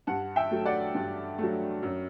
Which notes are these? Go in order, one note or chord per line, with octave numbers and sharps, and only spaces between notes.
G2 F#5 A5
E5 G5
F#3 A3
D5 F#5
G2
F#3 A3
F#2